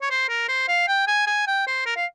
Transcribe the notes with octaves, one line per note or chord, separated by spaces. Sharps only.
C#5
C5
A#4
C5
F5
G5
G#5
G#5
G5
C5
A#4
F5